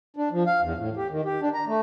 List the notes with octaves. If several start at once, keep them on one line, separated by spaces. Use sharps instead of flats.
D4
F3
F5
E2
A2
G4
D#3
G4
D4
A#5
A3